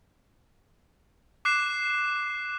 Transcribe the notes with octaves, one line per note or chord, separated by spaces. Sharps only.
D6 F#6 C7 E7